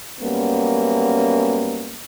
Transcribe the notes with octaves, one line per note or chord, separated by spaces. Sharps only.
F#2 G3 A#3 B3 C#4